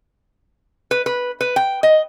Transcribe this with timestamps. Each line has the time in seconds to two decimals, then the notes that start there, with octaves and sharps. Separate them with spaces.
0.91 B4
1.06 B4
1.41 B4
1.56 G5
1.83 D#5